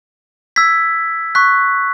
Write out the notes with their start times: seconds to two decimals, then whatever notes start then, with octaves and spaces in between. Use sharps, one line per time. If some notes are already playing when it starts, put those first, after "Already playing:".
0.56 E6 G#6 B6
1.35 C#6 F#6 B6